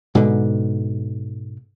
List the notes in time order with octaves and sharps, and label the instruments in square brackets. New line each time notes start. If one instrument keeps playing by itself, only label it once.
[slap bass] G#2 B2 D3